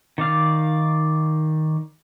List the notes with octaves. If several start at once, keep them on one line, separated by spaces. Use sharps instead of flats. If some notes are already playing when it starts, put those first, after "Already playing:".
D#3 D5 F5